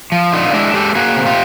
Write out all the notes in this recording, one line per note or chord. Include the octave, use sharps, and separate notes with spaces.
F3
D3 D#4 F4
G#3 D4 E4
G#3 G4 A4
A#3 F#4 G#4
C3
F4 G4